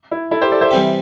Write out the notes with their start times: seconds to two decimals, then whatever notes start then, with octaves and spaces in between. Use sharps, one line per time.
0.11 E4
0.31 E4 A4
0.41 G4 C5
0.52 A4 D5
0.61 C5 E5
0.71 C3 E3 G3 C4 G4